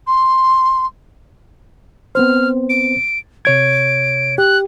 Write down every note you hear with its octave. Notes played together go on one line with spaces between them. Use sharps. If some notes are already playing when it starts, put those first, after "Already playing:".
C6
B3 C4 C5 F6
D7
C3 C#5 G#6 D7
G4 F#6